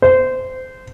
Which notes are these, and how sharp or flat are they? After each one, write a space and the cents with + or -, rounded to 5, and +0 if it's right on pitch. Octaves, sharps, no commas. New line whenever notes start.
C5 -20